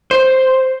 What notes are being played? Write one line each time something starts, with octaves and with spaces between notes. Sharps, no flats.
C5